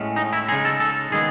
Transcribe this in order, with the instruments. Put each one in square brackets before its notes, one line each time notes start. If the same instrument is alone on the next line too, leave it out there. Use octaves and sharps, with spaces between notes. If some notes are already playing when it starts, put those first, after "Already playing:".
Already playing: [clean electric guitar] A2 G#3 C#4
D#4
E4
C#3 G#3 D#4 G#4
A4
A4
D#3 G#3 B3 G#4